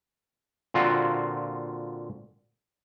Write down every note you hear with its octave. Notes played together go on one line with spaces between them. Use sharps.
A#2 D3 C4 F4 F#4